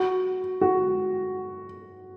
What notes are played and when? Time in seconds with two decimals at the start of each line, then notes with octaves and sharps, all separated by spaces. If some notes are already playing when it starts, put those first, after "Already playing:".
Already playing: F#4
0.61 F#4